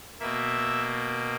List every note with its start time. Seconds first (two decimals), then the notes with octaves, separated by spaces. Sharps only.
0.20 B2 A#3 E5